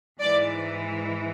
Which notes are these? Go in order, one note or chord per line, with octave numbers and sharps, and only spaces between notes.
G#2 E3 D5